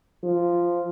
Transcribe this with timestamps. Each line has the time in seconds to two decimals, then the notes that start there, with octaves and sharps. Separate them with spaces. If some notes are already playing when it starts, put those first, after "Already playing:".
0.23 F3